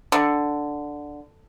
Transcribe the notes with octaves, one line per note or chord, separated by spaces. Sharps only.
D3